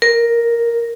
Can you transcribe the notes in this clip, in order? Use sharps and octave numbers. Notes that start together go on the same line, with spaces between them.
A#4